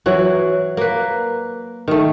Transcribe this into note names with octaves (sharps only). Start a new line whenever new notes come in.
E3 F#3 F#4
A#3 B4
D#3 A3